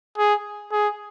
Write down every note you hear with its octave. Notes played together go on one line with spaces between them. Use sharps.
G#4
G#4